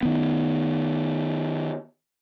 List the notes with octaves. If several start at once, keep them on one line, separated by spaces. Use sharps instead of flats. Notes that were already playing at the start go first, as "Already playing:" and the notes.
D#3 B3